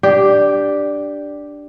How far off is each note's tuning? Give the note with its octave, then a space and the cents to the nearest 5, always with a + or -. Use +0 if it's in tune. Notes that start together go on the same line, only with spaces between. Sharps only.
D4 +0 G4 +0